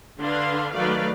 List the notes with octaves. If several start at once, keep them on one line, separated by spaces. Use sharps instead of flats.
D3 D4 B4 F5 C6
D#3 F#3 A3 B4 D5 F5